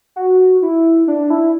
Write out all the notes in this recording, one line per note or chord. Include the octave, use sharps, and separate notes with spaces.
F#4
E4
D4
E4